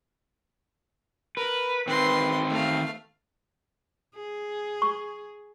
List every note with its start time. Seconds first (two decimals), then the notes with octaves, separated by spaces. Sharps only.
1.37 A#4 B4
1.88 D#3 C4 B4 C6
2.50 A3 F5
4.15 G#4
4.82 C#6